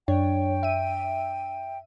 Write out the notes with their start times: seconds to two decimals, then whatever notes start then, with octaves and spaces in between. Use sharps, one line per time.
0.08 F#2 D4 C#5 G5
0.63 E5 D#7